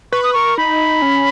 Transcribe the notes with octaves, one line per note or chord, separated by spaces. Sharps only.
B4 C#6
D#6
A#4 C#6
D#4 B5
C#4